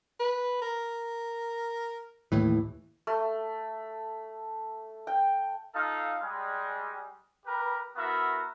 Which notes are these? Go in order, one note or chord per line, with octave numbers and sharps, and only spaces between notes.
B4
A#4
D#2 A2 E3
A3
G5
D#4 F4 A4 F5
G3 G#3
G4 A#4 B4
B3 E4 F#4 A#4 E5